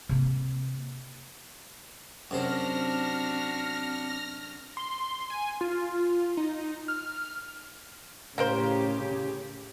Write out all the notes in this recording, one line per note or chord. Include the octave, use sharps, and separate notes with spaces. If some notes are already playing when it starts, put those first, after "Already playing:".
C3 A#3
F#2 C3 C4 D4 F#4 C5 F6 A#6
C6
G#5
F4
D#4
F6
A2 C#3 A#3 G4 A#4 C5